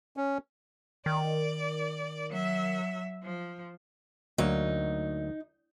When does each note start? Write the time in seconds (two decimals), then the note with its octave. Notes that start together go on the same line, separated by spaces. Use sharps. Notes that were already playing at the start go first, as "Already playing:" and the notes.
0.17 C#4
1.06 D#3 D5
2.30 F#3 E5
3.23 F3
4.38 D2 F#3 A#3 D#4